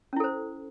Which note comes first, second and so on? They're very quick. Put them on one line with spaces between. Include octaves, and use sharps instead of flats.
C#4 E4 A4 C5